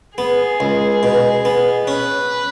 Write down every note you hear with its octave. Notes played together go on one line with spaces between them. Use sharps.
B3 G#4
C#2
B2
B3
C#4 B4